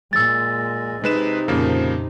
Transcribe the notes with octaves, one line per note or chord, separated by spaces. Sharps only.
A#2 G#3 E6 A6
C3 G#3 D#4 B4 E7
F2 A#2 C#3 F3 A#3